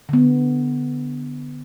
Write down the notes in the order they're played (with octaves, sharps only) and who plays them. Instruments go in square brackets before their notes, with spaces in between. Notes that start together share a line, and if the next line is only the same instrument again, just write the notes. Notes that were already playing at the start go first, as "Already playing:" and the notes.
[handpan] D3 B3